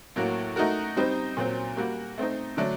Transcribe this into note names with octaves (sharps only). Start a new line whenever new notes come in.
A2 F#3 A#3 F#4
A3 D#4 F#4 A#4
G3 C4 D#4
A#2 F#3 C4
G3 A#3 F#4
A3 C4 D#4
D3 F#3 A3 D4